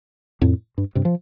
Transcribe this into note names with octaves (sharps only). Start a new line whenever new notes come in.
F2 A2
G2
G2 C3
F3